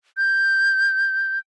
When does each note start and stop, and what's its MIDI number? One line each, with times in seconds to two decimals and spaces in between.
0.17 1.39 91